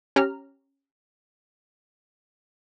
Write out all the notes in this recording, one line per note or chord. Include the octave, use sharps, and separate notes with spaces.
C#4 G4 A#5 F6